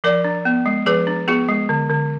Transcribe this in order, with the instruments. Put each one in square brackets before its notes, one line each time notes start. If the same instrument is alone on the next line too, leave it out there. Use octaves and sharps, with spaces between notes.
[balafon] F3 A#4 D5
D4
B3
G#3
F3 G#4 B4
D4
B3 F4 G#4
G#3
D3
D3